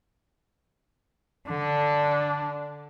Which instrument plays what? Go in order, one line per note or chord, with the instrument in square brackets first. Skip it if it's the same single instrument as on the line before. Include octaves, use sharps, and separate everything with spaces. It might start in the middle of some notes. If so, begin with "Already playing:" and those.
[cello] D3 [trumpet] D4